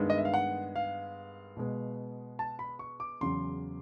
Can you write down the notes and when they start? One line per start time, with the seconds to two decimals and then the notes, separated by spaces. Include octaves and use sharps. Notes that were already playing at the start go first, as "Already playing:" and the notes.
Already playing: G2 D#3 G#3 B3
0.10 D#5
0.18 E5
0.25 F5
0.34 F#5
0.76 F5
1.57 B2 G#3 B3
2.39 A5
2.59 B5
2.79 C#6
3.00 D6
3.21 E2 C#3 F#3 C6